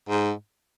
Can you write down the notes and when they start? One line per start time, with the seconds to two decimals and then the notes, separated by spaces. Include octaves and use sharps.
0.09 G#2